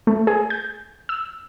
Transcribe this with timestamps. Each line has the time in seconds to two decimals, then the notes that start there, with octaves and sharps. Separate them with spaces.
0.07 A3
0.27 G#4
0.50 G6
1.09 E6